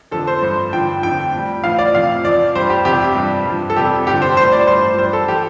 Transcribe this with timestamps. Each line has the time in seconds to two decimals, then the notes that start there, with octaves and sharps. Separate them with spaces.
0.11 F2 D3 F3 A4
0.27 C5
0.42 G2 F3 C5
0.73 G2 D3 F3 G5
1.03 F2 D3 F3 G5
1.34 A2 G3
1.64 A2 F3 F5
1.79 D5
1.95 F2 C3 F3 F5
2.25 F2 F3 D5
2.55 G2 G3 C5
2.70 G4
2.85 F2 C3 G3 G4
3.16 G2 G3
3.47 G2 F3
3.70 A4
3.76 F2 C3 G3 G4
4.06 G2 D3 F3 G4
4.22 C5
4.37 A2 G3 C5
4.52 D5
4.67 G2 F3 C5
4.97 G2 G3 C5
5.13 A4
5.28 F3 G4